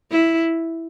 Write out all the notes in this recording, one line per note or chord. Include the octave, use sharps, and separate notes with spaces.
E4